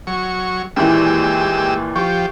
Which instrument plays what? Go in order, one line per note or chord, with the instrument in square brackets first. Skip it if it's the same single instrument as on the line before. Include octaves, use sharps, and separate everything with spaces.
[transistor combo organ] F#3 C#6
[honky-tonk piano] D#2 A#2 E3 [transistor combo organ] G#3 G4 E6
[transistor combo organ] F3 G4 [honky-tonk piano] C#6